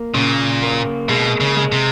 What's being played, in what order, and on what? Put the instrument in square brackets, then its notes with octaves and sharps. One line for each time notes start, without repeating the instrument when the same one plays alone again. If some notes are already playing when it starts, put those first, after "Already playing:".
Already playing: [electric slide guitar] A#3
[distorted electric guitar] A#2 [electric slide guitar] C#3
[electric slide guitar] A#3
[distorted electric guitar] B2 [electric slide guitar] G#3
[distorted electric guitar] C#3
[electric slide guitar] G#3
[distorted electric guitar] C3